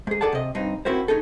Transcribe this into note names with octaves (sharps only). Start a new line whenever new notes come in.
G#2 G#4
G#4 A4 D5 F#5 A5
C3 D#5
G2 C4 D#4
C4 C#4 E4 F#4 A#4 C5
C#4 D#4 G#4 A4